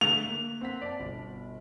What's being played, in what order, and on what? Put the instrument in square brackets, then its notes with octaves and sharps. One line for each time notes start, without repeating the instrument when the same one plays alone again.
[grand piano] D3 A3 [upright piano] F7
[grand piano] A#3
C4 F#5 B6
D5 A5
G1 B2